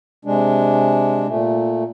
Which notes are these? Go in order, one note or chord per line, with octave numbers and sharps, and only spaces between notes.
C3 G#3 D4
A#2 A3